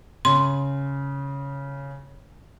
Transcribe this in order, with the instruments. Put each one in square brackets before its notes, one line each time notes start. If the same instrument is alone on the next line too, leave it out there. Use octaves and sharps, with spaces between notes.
[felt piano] C#3 [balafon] C6